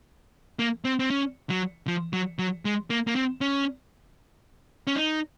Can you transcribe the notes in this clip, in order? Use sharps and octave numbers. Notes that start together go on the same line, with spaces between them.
A#3
C4
C4
C#4
F#3
F3
F#3
F#3
G#3
A#3
A#3
C4
C#4
C#4
D#4